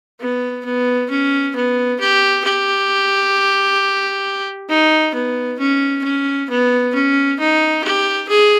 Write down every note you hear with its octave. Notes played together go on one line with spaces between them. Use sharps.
B3
B3
C#4
B3
G4
G4
D#4
B3
C#4
C#4
B3
C#4
D#4
G4
G#4